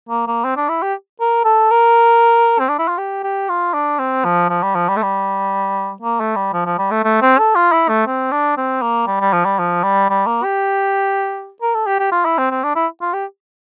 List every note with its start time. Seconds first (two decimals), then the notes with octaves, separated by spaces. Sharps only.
0.09 A#3
0.27 A#3
0.44 C4
0.57 D4
0.69 E4
0.82 G4
1.21 A#4
1.45 A4
1.71 A#4
2.59 C4
2.69 D4
2.79 E4
2.88 F4
2.98 G4
3.24 G4
3.49 F4
3.74 D4
3.99 C4
4.25 F3
4.50 F3
4.63 G3
4.75 F3
4.89 G3
4.96 A3
5.03 G3
6.03 A#3
6.20 A3
6.36 G3
6.53 F3
6.66 F3
6.78 G3
6.91 A3
7.04 A3
7.22 C4
7.39 A4
7.55 F4
7.72 E4
7.89 A3
8.07 C4
8.32 D4
8.57 C4
8.82 A#3
9.07 G3
9.21 G3
9.33 F3
9.45 G3
9.59 F3
9.83 G3
10.10 G3
10.27 A#3
10.44 G4
11.62 A#4
11.74 A4
11.87 G4
11.99 G4
12.12 F4
12.25 E4
12.38 C4
12.51 C4
12.64 D4
12.75 E4
13.02 F4
13.14 G4